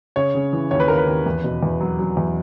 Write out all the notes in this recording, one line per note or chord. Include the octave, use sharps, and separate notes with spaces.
C#3 C#5
C#3
E3
D#2 C#5
B4
D#2 A#4
B4
D#2
E2
B2
E2
F#3
F#3
E2